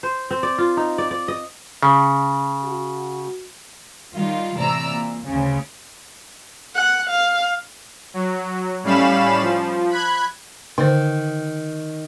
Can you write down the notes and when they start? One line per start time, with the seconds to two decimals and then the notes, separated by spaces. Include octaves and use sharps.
0.03 C5
0.31 C4
0.43 D5
0.58 F4
0.77 D#4
0.98 D5
1.11 D5
1.28 D#5
1.83 C#3
2.64 F#4
4.13 D#3 G3 F4
4.56 A2 C3 E3 D5 A#5 E6
4.92 A#2
5.26 D2 C#3
6.75 F#5
7.10 F5
8.14 F#3
8.83 A2 G3 C#4 F5 B5 E7
9.42 F3
9.90 B5 F#6 G#6
10.78 D3 D#3 C5